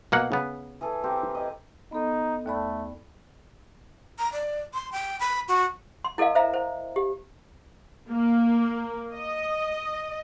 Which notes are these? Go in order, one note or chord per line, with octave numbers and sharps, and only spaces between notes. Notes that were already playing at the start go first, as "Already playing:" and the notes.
B2 A#3 F#5
C#3 B3
E3 G#4 A4
C4 G4 A#4
G#4 D#5
B3 D#4 A4
D#2 A3 D5 B5
A#5
D5
C6
G5
B5
F#4
C6
E4 A4 A#4 D#5 F5
C5 E5 F5 A#5
C5
G4
A#3
D#5